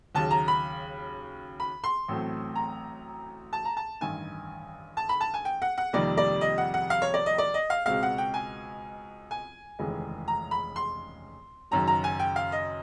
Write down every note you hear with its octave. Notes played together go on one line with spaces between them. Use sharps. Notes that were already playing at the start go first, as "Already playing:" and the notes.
D#2 C#3 F#3 A5
A#5
B5
B5
C6
A1 A2 F#3 A3 C4
A#5
A5
A#5
A5
A1 G2 D#3 G#5
A5
B5
A5
G#5
G5
F#5
F#5
F2 C3 D#3 G3 A#3 D5
D5
D#5
F#5
F#5
F5
C#5
D5
D#5
D5
D#5
F5
C#2 B2 G#3 C4 F5
F#5
G5
G#5
G#5
F1 D#2 C#3 E3 G#3
A#5
B5
C6
F#1 F#2 D#3 F#3 A#5
A#5
G#5
G5
F5
D#5